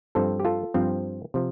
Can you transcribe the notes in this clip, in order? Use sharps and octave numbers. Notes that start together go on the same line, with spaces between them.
G2 F3 C4 A4 C5
G4
F4 A4
G2 F3 C4
C3 F3